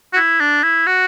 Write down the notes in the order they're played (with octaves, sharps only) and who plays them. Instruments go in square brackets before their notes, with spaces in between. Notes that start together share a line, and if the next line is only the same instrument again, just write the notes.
[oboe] F#4
E4
D4
E4
F#4